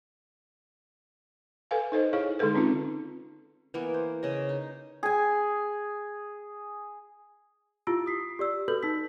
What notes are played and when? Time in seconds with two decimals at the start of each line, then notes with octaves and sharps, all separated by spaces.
1.71 A4 B4 F5 G#5
1.92 D#4 A4 C5 D#5
2.13 E4 G#4 C#5 F5
2.39 D3 G#3 D#4 G#4 A4 B4
2.55 C4 C#4 D#4 F4
3.74 E3 A#3 B3
3.94 C5
4.23 C#3 C#4 D#5
4.49 D#4
5.03 G#4 G#5
7.87 E4 F4 G4 E6 D7
8.06 D#6 B6 C7
8.39 G4 D5 E6
8.68 F#4 A4 B4 G6 F#7
8.83 D#4 E6 B6